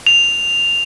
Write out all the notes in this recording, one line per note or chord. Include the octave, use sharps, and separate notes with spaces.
F7